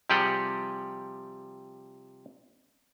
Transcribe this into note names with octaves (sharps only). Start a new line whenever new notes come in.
C3 F3 G3 G4 G#4 F#5